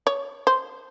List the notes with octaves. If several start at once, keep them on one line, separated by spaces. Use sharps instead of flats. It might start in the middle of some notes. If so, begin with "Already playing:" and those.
C#5
C5